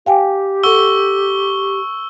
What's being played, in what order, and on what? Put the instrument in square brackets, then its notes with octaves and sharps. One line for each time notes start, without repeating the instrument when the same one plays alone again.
[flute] G4 [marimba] F5 G5 G#5
[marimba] A4 F#5 [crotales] C#6 E6 G7